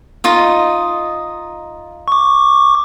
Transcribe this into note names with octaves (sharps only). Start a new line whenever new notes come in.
D#4 F4 D#5
C#6 D6